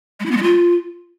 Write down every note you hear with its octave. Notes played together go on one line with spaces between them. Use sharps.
G#3
E4
B3
G#3
F4